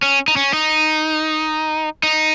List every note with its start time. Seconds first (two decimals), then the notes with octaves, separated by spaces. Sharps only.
0.03 C#4
0.28 D#4
0.36 C#4
0.53 D#4
2.03 D#4